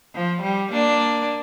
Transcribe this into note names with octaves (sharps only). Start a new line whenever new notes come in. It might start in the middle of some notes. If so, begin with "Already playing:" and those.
F3
G3
A#3 D4